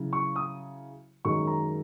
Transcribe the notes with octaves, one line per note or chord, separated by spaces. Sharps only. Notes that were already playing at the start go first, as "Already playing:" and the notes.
Already playing: C#3 F#3 E4
C#6
D#6
F#2 D#3 G#3 C#6
A#5